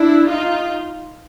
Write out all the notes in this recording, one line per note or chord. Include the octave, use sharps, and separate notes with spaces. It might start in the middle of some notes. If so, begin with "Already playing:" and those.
Already playing: D4 E4
D#4 F4